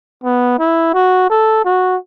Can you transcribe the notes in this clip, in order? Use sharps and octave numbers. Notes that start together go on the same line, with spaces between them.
B3
E4
F#4
A4
F#4